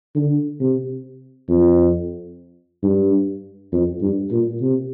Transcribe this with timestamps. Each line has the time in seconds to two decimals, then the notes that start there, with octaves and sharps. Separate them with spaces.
0.15 D3
0.60 C3
1.49 F2
2.83 G2
3.72 F2
4.02 G2
4.31 A#2
4.61 C3